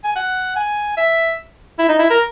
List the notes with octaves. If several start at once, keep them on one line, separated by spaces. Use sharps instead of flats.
G#5
F#5
G#5
E5
E4
D#4
E4
A#4